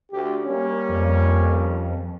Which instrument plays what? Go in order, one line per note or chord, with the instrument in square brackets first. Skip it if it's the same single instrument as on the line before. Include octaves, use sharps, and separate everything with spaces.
[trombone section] D2 G4
G3 A#3 C#4
[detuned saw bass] F2